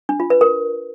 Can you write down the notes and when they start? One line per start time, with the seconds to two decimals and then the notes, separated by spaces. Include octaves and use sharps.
0.09 D4
0.20 F4
0.30 B4
0.41 A#4